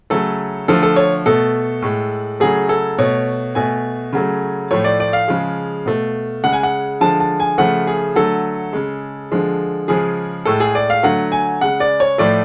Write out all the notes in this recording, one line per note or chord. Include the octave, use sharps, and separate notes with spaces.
C#3 F#3 A3 A4
D3 F3 A3 A4
A4
C#5
B2 A3 A4
A2 G#3
C#3 F#3 A3 G#4
A4
B2 A3 C#5
B2 A3 G#5
C#3 F#3 A3
A2 F3 A3 C#5
D5
D5
F5
C#3 F3 G#3
B2 A3
C#3 G#3 F#5
G#5
F#5
D3 F3 G#3 A5
A5
G#5
C#3 F3 A3 F#5
G#4
D3 F#3 A3 A4
C#3 G#3
D3 F3 G#3
C#3 F3 G#3 G#4
A2 G#3 A4
G#4
D5
F5
D3 F#3 A3 F#5
G#5
C#3 G#3 F#5
D5
C#5
A2 F3 A3 D5